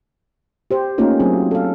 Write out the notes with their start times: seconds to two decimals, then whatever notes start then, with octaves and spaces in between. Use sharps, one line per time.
0.71 G4 C5
0.98 A3 A#3 C#4 D#4 F4 A#4
1.20 F#3 C4 G#4
1.51 A4 F5